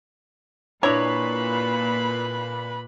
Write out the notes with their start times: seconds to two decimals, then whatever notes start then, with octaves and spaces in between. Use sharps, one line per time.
0.83 A#2 D4 E4 B4 C#5 A#5 B5